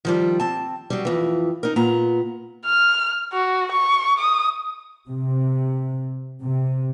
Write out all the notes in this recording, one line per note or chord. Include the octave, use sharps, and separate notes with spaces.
D#3 F3 G3
C4 A5
F#3 G3
F2 E3
D#4 A#4
A#2 B3 A#5
F6
F#4
C#6
D#6
C3
C3